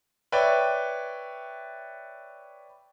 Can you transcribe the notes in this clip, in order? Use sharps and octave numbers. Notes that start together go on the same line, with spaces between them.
B4 C#5 D5 E5 G5